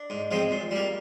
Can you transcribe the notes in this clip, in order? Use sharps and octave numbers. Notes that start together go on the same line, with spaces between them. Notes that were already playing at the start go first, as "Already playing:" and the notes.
Already playing: D4
G#2
F3 G#3 C4
A#2
G3 A#3